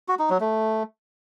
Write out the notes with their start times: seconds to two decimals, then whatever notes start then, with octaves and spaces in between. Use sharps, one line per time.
0.08 F#4
0.19 D#4
0.30 F#3
0.40 A3